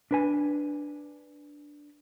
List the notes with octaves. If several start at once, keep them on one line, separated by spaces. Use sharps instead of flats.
D4 B4 G#5